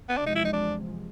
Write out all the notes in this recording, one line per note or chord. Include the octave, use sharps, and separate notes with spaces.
B3
E2 C3 F3 G#3 D4
D#4
E4
D#4
D4